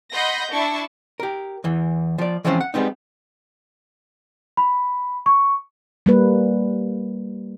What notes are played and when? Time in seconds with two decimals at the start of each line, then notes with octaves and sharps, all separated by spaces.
0.12 D#5 F#5 B5 C6 G6 A#6
0.51 D4 E4 A5 C#6
1.20 G4 A#4
1.64 E2 E3
2.18 F3 D5
2.45 E3 F3 G#3 C4 C#4 F4
2.61 F#5
2.74 G3 G#3 B3 C4 D#4
4.57 B5
5.26 C#6
6.06 G3 A#3 B4